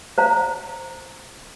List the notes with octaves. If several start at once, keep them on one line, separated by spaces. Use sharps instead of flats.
C5 F5 A#5